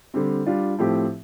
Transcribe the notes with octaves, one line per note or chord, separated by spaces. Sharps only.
D3 G3 C4
G3 D4 F4
A2 F3 A3 C4 G4